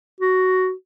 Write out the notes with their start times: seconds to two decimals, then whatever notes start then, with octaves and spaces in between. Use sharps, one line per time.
0.20 F#4